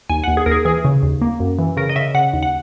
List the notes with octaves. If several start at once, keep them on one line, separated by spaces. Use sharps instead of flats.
D#2 G#5
F#5
D#2
G#4
D#2 A#4
G#4
E3 G#4
C#3
D#2
A#3
F#2
E3
C#3 A#4
D#5
C#3 E5
C#3 F#5
D#2
F#5